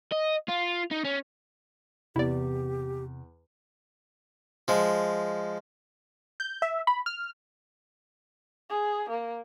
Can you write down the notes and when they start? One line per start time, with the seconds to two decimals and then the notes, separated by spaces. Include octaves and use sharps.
0.12 D#5
0.49 F4
0.91 D#4
1.05 C#4
2.16 E2 C3 E4 G4 D5
4.68 F3 G#3
6.40 G6
6.62 E5
6.87 B5
7.06 F6
8.70 G#4
9.10 A#3